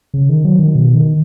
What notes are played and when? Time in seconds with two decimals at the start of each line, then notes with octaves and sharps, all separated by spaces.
0.14 C#3
0.29 D#3
0.45 F#3
0.59 D#3
0.75 B2
0.95 D#3